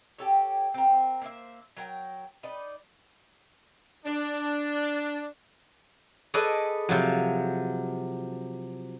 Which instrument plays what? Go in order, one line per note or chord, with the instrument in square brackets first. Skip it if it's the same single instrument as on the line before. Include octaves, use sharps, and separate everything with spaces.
[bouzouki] G4 A4 C#5
C4 A#4
A#3 C5 C#5 E5
F#3 A#4 G5
D#4 B4 D5
[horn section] D4
[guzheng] G#4 A4 B4 D5 D#5
C3 F3 F#3